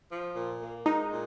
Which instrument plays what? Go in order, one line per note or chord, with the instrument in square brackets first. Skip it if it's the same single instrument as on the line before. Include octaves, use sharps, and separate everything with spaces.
[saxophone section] F3
A#2
A#3
[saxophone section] G#3 [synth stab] D#4
[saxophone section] A#2